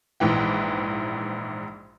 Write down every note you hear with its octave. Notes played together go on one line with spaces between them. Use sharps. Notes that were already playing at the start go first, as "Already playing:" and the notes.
A#1 G#2 E3 G5